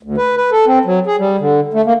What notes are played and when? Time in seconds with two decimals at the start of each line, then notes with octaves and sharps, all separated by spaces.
0.03 D2
0.17 B4
0.37 B4
0.52 A4
0.67 C4
0.85 F#3
1.07 G#4
1.19 G3
1.40 D3
1.74 A3
1.86 A#3